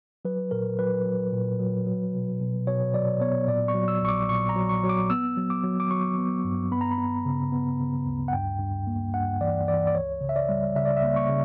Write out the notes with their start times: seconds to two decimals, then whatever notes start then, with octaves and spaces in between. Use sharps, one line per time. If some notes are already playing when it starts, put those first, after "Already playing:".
0.25 F#3 B4
0.51 A#2 A#4
0.79 F#3 B4
1.06 F#3
1.33 A#2
1.59 F#3
1.86 F#3
2.14 B2
2.41 B2
2.67 B2 C#5
2.94 F#3 D5
3.21 B3 C#5
3.47 A#2 D5
3.68 C#6
3.75 F#3
3.88 E6
4.02 A#1 C#6
4.09 D6
4.29 A#2 C#6
4.49 A#5
4.56 F#3
4.69 C#6
4.83 F#3
4.89 D6
5.10 B3 E6
5.37 F#3
5.50 D6
5.64 F#3
5.80 D6
5.91 F#3 C#6
6.18 B3
6.44 G2
6.72 B3 B5
6.81 A#5
6.92 B5
6.98 B3
7.25 C#3
7.52 B3
7.80 C#3
8.06 D2
8.28 F#5
8.33 G2 G5
8.59 G2
8.87 A#3
9.14 G2 F#5
9.41 E3 D5
9.68 E3 D5
9.87 D5
9.94 C#2 C#5
10.21 C#3
10.29 E5
10.36 D5
10.49 G3
10.76 C#3 E5
10.85 D5
10.97 E5
11.03 A#3
11.16 C#6
11.29 C#3